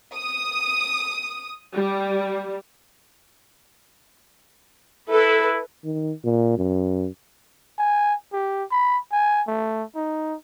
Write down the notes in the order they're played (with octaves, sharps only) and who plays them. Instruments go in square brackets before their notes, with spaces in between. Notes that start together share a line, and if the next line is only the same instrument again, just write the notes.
[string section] D#6
G3
[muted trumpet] E4 [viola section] A4 B4
[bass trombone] D#3
A#2
F#2
[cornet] G#5
G4
B5
G#5
A3
D#4